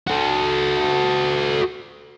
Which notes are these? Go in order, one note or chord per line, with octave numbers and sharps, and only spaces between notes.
F#4 A4